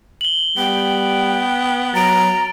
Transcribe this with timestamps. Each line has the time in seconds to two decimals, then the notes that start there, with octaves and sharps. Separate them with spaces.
0.21 F#7 G7
0.57 G3 B3 G5
1.94 F#3 A#5 A6 D7